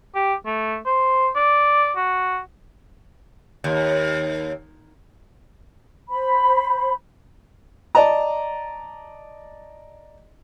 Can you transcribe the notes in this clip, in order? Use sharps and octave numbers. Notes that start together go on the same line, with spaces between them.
G4
A3
C5
D5
F#4
D#2
C5 B5
D5 D#5 A5 A#5